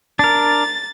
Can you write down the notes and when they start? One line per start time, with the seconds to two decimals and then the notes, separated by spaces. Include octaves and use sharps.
0.19 D4 A#4 A6